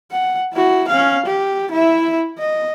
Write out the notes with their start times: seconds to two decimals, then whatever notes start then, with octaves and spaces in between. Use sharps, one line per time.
0.11 F#5
0.53 E4 F#4
0.88 C#4 F5
1.26 G4
1.72 E4 E5
2.38 D#5